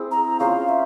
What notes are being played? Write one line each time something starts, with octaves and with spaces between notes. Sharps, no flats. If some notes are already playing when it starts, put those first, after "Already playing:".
Already playing: C4 E4 G#4
A#5
C#4 F4 G#4 C5 F5
E5